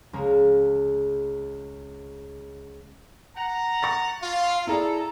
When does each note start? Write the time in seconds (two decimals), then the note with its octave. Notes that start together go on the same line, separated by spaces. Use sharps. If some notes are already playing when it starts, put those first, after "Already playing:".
0.13 C#2 G#3 A#3
3.36 F#5 A#5
3.82 C#6 A6 A#6
4.22 F4 F5
4.67 E4 G#4 A4 D5 A#5